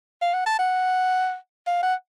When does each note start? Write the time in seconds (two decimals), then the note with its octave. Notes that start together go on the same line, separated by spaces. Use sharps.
0.22 F5
0.34 F#5
0.46 A5
0.59 F#5
1.67 F5
1.83 F#5